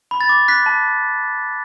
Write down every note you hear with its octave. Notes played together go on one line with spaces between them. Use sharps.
B5
A6
D6
F#6 B6
A5